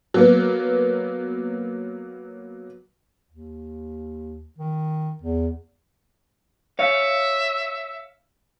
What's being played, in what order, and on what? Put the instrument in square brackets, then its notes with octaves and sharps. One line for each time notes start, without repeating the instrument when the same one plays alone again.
[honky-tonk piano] F#3 A#3 B3
[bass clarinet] D#2
D#3
E2
[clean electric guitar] C#5 F5 [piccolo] E5